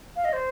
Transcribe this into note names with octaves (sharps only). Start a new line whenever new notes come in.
F5
D#5
C5